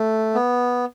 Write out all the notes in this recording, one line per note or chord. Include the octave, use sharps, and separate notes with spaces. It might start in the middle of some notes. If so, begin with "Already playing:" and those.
Already playing: A3
B3